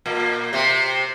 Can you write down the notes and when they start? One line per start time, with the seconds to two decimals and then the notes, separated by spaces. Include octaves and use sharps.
0.06 A#2 A#3
0.53 C3 C4